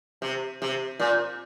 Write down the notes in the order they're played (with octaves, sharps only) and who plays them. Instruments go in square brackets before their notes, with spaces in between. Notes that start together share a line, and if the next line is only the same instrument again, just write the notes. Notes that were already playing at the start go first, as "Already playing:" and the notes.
[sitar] C3
C3
A#2